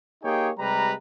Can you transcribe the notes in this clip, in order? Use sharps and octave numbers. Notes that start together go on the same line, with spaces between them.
A#3 D#4 G4 G#4 C#5 G5
C3 G3 G#3 B4 A#5